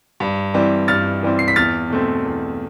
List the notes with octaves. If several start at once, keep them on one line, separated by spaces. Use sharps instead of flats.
G2
E3 G3 C4
G2 F6 A6
E3 G3 C4
C7
B6
E2 F6 A6
B2 A3 C4
E2